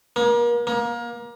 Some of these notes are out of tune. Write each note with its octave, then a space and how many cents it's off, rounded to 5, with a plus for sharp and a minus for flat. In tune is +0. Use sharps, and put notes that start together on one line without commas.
A#3 +35
A#3 +25